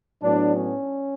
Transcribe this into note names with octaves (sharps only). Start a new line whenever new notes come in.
A2 F#3 B3 D4
C#4